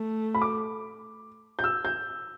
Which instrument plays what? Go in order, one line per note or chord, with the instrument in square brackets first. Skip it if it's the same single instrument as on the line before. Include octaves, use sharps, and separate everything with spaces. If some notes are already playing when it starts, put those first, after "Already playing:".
Already playing: [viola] A3
[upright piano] B5
D6
G6
E6
G6